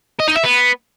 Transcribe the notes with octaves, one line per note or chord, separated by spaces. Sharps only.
D#5
D#4
E5
B3